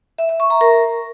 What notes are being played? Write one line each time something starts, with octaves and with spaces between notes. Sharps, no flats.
E5
E5
C#6
A#5
A#4